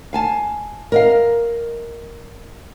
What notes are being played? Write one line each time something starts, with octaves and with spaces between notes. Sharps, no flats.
F5 G#5 A5
A#4 D#5 F5